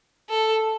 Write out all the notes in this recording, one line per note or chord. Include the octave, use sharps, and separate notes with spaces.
A4